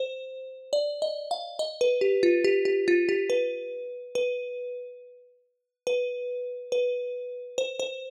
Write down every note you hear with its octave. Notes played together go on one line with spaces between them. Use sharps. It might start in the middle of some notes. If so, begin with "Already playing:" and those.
Already playing: C5
D5
D#5
F5
D#5
B4
G4
F4
G4
G4
F4
G4
B4
B4
B4
B4
C5
C5